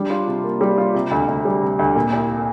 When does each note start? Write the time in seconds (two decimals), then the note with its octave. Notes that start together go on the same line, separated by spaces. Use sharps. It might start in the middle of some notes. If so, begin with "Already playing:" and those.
Already playing: G3 D4
0.10 F4
0.27 C3
0.44 A#3
0.61 G3
0.78 F4
0.95 C3
1.11 D2
1.28 D2
1.45 G3
1.62 C3
1.79 D2
1.95 A#2
2.13 C2